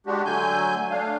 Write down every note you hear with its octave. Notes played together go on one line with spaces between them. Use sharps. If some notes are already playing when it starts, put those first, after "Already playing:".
G#3 D4 F#4 G4
D3 F#3 A3 G#5 G6
A3 D4 F5